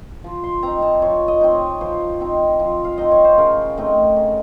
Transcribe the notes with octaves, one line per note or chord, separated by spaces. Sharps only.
F3
C6
C4 D#4 A#5
A5
F3 C#5
D#5
C4 D#4
C#5
F3 C5
C4 D#4
F3
F5
C4 D#4 D#5
C#5
C5
C#3 A#4
A3 C4 D#4
C#3